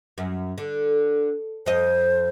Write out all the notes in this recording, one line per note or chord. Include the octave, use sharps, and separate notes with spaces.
F#2
D3
F2 C5 D#5